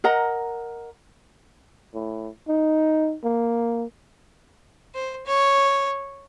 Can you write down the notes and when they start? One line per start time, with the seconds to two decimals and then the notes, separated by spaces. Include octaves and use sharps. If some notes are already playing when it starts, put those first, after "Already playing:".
0.04 A#4 D#5 F#5 A#5
1.94 A2
2.48 D#4
3.24 A#3
4.95 C5
5.26 C#5